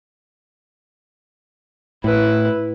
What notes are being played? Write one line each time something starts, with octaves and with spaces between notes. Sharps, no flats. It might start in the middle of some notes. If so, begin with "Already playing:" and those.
A2 E4 B4